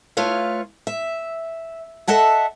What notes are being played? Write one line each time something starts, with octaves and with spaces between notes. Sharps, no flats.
A3 F4 B4 C#5 F5
E5
A4 D#5 E5 F#5 A5